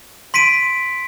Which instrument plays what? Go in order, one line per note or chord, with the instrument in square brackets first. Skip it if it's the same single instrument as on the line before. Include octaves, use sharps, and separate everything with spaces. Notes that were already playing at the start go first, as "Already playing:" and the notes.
[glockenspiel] C6 B6 D7 D#7